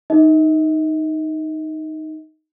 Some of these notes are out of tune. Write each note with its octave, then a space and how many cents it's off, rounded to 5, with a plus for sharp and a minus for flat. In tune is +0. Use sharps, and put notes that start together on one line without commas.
D#4 +0 E5 -45